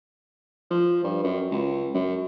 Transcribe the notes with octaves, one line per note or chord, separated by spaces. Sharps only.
F3
G2
F#2
C#2
F#2